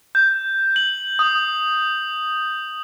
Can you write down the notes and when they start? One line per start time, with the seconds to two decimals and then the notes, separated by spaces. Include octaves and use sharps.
0.15 G6
0.76 F#7
1.19 D#6